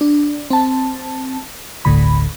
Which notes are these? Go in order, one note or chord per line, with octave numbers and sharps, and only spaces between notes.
D4
C4 A5
G1 D2 A2 D3 B5